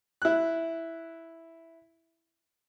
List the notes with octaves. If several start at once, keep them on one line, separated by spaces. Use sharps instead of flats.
E4 F#6